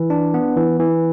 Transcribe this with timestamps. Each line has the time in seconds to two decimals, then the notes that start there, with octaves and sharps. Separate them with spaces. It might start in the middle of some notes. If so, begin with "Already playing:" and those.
Already playing: E3
0.10 D4
0.34 B3
0.57 E3
0.80 E3